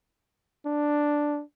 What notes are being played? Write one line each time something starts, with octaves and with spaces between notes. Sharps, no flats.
D4